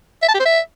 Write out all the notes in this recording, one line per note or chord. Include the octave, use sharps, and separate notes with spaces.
E5
A5
G4
C5
E5